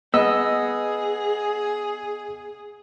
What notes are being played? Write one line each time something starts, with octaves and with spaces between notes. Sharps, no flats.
B3 G#4 D#5 E6